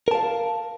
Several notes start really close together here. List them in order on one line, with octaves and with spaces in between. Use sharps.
A#4 A5 F5